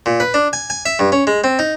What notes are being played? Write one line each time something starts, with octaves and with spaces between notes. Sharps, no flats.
A#2
B4
D4
G#5
G#5
E5
G2
C#4
G#3
C4
D#4